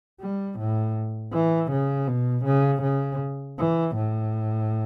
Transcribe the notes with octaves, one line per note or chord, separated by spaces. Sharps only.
G3
A2
E3
C#3
B2
C#3
C#3
E3
A2